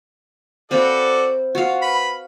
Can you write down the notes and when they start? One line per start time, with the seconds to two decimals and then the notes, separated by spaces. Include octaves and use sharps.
0.71 C4 F#4 A4 D5 F5 B5
1.55 F4 F#4 F5
1.82 B4 B5